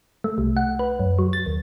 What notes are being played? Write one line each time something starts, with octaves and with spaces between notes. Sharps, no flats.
A3
C2
F#5
B4
F#2
F#3
A6
D#2